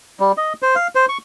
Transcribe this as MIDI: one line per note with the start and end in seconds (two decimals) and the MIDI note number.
0.20 0.32 55
0.37 0.53 75
0.62 0.75 72
0.75 0.88 77
0.95 1.06 72
1.09 1.18 85